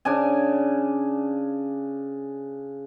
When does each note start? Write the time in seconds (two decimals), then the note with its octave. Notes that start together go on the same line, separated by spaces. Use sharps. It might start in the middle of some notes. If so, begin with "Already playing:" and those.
0.05 C#3 D4 G#5